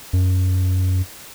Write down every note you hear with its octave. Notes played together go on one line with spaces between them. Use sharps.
F#2